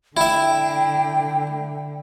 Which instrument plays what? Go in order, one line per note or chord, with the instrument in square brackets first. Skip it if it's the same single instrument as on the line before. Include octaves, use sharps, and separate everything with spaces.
[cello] D3 [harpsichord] E4 E5 [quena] G5